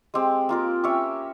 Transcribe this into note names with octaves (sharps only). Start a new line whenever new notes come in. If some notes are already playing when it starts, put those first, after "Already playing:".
G#3 C4 G4
A#3 F4 A#4
C#4 G4 C#5 E5